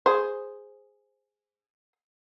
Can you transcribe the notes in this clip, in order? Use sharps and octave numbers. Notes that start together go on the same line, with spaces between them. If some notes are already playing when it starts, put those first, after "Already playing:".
G#4 C5